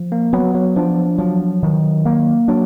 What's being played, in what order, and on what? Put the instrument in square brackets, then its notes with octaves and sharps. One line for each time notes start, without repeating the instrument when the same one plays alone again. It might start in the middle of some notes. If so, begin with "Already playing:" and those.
Already playing: [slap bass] F3
[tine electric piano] A#3
[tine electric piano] F#3 [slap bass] B3
[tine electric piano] F#3
[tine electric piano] F3 [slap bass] D4
[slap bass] F3 [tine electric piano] F#3
[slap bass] D#3
A#3
[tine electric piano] F#3 [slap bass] D4